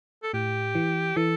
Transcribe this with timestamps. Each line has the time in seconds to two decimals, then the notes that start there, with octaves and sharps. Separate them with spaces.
0.23 A4
0.33 A2 G4
0.75 E3
1.16 E3 A4